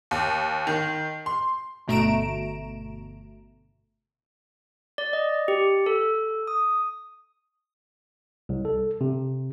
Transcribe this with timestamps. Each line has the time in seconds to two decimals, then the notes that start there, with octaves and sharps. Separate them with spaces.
0.11 D#2
0.67 D#3
1.26 C6
1.88 G1 B2 A3 A#5 D7 E7
4.98 D5
5.13 D#5
5.48 G4
5.86 A4
6.47 D#6
8.49 C2
8.65 A4
9.01 C3